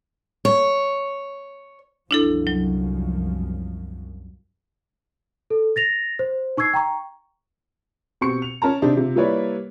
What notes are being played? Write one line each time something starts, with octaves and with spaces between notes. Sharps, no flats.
C#5
C2 F#2 F3 D4 E4 A4
F#3
A4
A6 A#6 F7
C5
D#4 C#6 E6 G#6 C7
G5 A#5 C#6
B2 C4 G4 C#6 C#7
F7
C#4 A#4 A5 A#5
C3 D4 D#4 C5
C3 F4
G3 A#3 E4 B4 C#5 D5